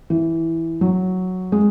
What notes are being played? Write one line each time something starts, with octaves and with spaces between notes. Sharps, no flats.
E3
F#3
G#3